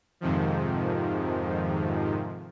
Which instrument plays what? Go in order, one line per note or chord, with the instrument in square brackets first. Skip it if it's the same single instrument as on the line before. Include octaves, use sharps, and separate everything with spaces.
[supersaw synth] F2 G#2 C3 D#3 F3